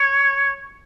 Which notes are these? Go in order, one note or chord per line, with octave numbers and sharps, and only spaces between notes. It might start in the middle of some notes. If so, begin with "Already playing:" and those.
Already playing: C#5